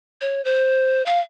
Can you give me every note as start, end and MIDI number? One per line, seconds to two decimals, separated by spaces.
0.21 0.43 73
0.45 1.04 72
1.06 1.20 77